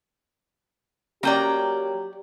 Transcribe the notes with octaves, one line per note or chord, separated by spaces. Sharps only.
F#3 A#3 C#4 G4 D5 G5 A#5